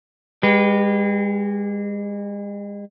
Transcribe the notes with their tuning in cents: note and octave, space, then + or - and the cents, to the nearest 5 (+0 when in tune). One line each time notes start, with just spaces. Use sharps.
G#3 -35 G4 +0 B4 +0